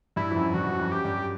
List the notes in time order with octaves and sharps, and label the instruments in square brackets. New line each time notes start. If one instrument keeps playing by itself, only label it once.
[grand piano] G2 [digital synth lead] E4
[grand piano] F2
F#2
[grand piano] G2 [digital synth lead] F#4
[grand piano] F#2
F2
[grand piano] F#2 [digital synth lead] G4
[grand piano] G2